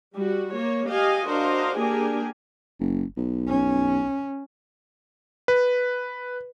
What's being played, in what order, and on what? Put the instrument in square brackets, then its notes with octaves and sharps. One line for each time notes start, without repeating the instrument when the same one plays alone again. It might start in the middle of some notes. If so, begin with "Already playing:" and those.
[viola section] G3 F#4
A#3 C#5
G4 D#5 F5 G#5
D4 F#4 A#4 C5 D#5 F5
A#3 D4 G4 G#4 A#4 G#5
[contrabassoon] F#1
B1
[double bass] C#4
[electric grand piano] B4